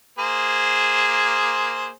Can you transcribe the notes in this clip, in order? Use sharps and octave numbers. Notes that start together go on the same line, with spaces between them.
A#3 G#4 C5